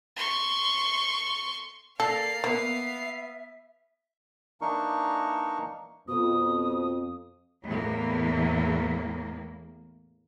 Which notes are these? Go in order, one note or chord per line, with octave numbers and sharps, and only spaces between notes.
C6 C#6
A#3 A4 D5 F5 C7
A#3 B3 E5
E3 A#3 D4 D#4 A#4 C#6
F2 B2 D#6
E2 A2 A#3